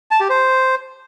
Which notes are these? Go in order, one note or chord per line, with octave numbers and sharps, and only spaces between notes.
A5
G4
C5